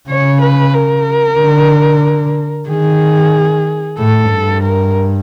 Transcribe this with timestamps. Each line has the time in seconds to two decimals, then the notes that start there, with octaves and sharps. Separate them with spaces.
0.09 C#3 C#5
0.42 B4
0.74 A#4
1.39 D3
2.68 D#3 G#4
3.98 A2 A4
4.31 G2
4.63 A#4